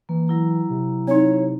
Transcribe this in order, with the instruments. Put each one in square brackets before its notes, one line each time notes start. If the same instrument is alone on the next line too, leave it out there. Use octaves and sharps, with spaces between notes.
[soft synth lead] E3 [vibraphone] A#3
[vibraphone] F#3 E4 A#5
[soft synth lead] C3
[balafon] C4 D#4 [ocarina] C#5